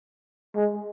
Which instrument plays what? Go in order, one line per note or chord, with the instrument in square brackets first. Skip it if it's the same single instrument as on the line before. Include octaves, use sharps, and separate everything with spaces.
[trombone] G#3